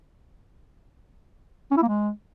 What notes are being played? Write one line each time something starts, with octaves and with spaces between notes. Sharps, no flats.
C#4
E4
A#3
G#3